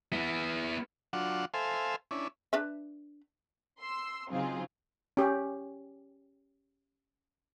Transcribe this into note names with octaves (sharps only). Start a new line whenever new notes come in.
B3 E4
F#3 D4 F4 F#5
A4 C5 E5 F5 G#5
C#4 D4 E4
D4 B4 E5
C6 E6
C#3 F#3 C4 D#4 F4 G#4
C#4 G4